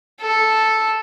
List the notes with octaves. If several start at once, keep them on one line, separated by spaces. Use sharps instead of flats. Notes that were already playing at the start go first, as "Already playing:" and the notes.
A4